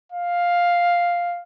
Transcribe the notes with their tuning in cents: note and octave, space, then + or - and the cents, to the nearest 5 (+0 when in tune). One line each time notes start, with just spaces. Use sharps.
F5 +5